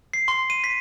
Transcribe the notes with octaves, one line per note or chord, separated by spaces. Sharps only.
C7
C6
D#7
B6